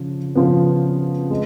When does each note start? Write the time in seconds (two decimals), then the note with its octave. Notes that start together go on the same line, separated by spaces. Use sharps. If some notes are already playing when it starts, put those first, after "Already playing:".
Already playing: C#3 F3
0.35 C#3 F3 B3
1.30 G#3